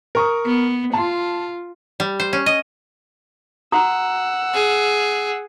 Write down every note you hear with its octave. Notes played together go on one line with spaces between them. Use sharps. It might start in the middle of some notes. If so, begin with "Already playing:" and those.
A#4 C#6 D#6
B3
F4 A5 C6
G3
C5
C#4
D#5
F#4 F#5 A#5 D#6 E6
G#4